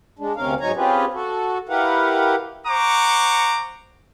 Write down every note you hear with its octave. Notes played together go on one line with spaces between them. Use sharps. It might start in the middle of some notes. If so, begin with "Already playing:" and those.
G#3 D4
D2 C3 C#4 A#4 F5
G#2 F#3 D#4 C#5 G#5 A#5
C4 C#4 F4 G4 G#4 B4
F#4 A4
E4 G4 A#4 B4 F5 F#5
C5 F#5 A#5 C#6 D6